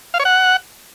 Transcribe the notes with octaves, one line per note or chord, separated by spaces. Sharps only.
F5
C#5
F#5